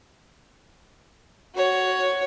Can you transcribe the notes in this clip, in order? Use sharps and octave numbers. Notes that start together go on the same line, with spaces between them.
F#4 C#5